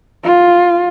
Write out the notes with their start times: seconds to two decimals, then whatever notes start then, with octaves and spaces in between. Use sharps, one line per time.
0.24 F4